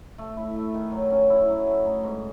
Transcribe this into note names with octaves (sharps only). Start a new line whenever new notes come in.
A3
E4
A3
D#3
F#3
C#4
E4
F#3
A3
D#4
G#2